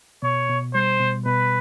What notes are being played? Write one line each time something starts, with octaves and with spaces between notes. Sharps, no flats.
B2 C#5
B2
G3 C5
B2
B2 B4